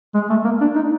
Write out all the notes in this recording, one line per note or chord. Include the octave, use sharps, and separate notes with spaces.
G#3
A3
A#3
D4
D#4